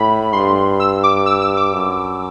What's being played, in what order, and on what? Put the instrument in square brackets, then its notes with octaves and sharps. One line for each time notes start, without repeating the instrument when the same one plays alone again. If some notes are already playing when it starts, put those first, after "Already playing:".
Already playing: [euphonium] A2 [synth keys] B5
[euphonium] G2 [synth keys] C6
[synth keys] E6
D6
E6
E6
D6
[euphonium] F#2